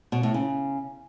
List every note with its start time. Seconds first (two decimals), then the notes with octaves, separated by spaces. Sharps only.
0.12 B2
0.23 A2
0.34 C#3